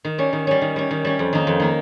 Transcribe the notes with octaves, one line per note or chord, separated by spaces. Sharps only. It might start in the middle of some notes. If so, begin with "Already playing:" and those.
D#3
G3 C#4
D#3
G3 C#4
D#3
G3 C#4
D#3
G3 C#4
F2
D#3 A#3 D#4
F2
D#3 A#3 D#4